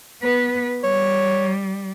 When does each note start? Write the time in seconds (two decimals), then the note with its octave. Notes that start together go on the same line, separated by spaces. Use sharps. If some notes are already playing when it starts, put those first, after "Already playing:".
0.22 B3 B4
0.84 G3 C#5